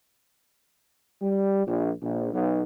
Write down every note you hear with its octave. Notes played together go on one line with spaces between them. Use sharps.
G3
A#1
A#1
B1